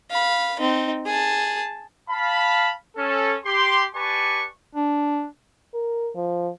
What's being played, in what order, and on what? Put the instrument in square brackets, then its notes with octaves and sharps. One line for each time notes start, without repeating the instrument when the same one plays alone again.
[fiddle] F5 B5
C4 D#4
G#4 A5
[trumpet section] F5 A5 B5
C#4 A4
G4 C6
G4 B4 D5 G#5 A5 C#6
[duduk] D4
[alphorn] A#4
F3